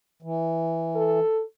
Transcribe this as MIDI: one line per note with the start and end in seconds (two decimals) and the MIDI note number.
0.23 1.20 52
0.95 1.43 69